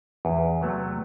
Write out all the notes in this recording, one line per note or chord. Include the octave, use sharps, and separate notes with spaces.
E2
C3 F#3 A3